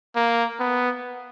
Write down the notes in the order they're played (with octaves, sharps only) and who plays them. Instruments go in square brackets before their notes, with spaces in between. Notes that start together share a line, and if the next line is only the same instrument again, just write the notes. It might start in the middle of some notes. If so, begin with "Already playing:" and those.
[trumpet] A#3
B3